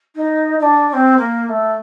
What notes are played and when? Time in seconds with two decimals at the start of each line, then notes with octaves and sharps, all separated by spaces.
0.15 D#4
0.58 D#4
0.62 D4
0.88 D4
0.93 C4
1.17 A#3
1.45 A#3
1.48 A3